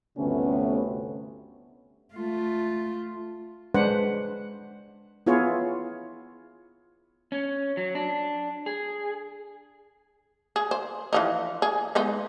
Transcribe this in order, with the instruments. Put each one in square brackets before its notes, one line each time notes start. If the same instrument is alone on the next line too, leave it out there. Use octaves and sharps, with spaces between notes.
[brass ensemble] G1 D2 C3 A3 B3 C#4
[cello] A3 F4
[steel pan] G#3 D4 B4 C5 F#5
B3 E4 F4 G#4 C#5
[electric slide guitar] C#4
F#3
D4
G#4
[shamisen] G#4
C5
E3 F3 D#4
G#4
G#3 B3 D#4